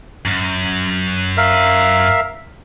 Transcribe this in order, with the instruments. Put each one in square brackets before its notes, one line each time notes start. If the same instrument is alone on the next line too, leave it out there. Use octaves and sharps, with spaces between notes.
[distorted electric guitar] F#2
[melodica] A#4 E5 F5